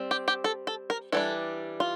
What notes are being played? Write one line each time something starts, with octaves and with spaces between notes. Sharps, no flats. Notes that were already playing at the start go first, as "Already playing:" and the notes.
Already playing: G3 C4
G4
G4
A4
A4
A#4
E3 G3 D4 A4
F4